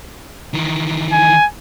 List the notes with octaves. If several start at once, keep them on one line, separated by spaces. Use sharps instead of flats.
D#3 E3
G#5